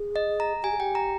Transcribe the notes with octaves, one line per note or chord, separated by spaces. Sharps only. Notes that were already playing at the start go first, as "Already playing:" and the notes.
Already playing: G#4
D#5
A#5
G4 G#5
G#4
G4 G5
A#5